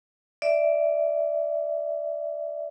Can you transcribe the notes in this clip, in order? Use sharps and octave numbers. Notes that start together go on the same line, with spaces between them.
D5 E5